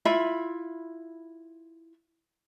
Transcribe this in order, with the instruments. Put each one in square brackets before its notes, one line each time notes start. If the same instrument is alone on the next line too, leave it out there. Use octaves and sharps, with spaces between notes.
[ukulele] E4 F4 E5 B5